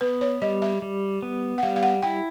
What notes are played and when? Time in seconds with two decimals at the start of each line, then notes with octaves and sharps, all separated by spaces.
0.01 B3 B4
0.21 C#5
0.42 G3 D#5
0.62 E5
0.82 G3
1.22 B3
1.58 F#5
1.63 G3 F5
1.76 F5
1.83 F#5
2.03 E4 G5